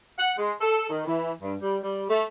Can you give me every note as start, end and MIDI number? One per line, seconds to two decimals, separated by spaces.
0.18 0.32 78
0.38 0.54 56
0.61 0.88 69
0.90 1.06 51
1.07 1.32 52
1.42 1.55 43
1.62 1.77 55
1.83 2.03 55
2.09 2.25 57